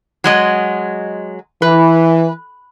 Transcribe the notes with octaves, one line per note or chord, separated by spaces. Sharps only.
F#3 G#3 D#5
E3 B4